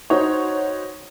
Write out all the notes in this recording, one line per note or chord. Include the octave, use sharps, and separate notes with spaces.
D#4 F#4 C5 C#5